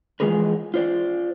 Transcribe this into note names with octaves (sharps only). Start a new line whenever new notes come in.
E3 F3 G#3 G#4 A#4 B4
F4 C5 D5